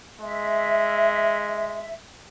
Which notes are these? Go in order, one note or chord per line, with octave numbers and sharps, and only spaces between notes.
G#3 E5